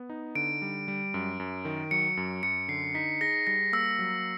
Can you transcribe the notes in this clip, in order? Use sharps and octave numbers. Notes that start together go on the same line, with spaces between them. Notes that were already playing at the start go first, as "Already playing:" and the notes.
Already playing: B3
D#4
D3 D7
G3
G3
F#2
F#2
D#3
F#3 C#7
F#2
F#2 C#7
D3 C7
D#4 B6
G#4 A#6
G3 A#6
A#3 E6
F#3